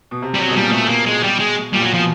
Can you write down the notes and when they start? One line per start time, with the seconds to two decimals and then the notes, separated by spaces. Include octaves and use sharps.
0.11 B2
0.22 C3
0.34 G3
0.39 F#3
0.47 B2 G#3
0.56 A#2 G3
0.66 B2
0.73 A3
0.89 A#3
1.06 G#3
1.23 G3
1.39 G#3
1.73 A#2 G3
1.83 F#3
1.94 F3
1.99 B2